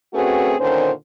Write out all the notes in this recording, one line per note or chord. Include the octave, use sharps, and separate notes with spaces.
A3 C4 C#4 F#4 G#4 B4
A#2 D3 D#3 C#4 C5